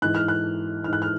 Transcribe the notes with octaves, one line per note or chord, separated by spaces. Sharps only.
G#2 E3 F#6
F6
F#6
G#2 E3 F6
F#6
F6